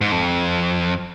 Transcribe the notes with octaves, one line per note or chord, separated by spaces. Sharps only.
G#2
F2